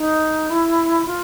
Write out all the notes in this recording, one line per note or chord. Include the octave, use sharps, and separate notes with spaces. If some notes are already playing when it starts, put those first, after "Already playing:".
Already playing: D#4
E4
F4